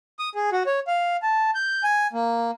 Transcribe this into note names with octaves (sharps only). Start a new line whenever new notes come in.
D#6
G#4
F#4
C#5
F5
A5
G6
G#5
A#3